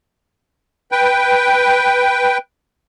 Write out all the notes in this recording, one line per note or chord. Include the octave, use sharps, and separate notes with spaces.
B4 G5